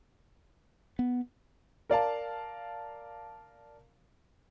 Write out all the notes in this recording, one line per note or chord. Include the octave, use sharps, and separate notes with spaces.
B3
A#4 D5 F5 A5